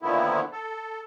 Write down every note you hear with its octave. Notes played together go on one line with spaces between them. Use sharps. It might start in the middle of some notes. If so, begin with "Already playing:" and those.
A#2 D3 D#3 F3 B3 E4
A4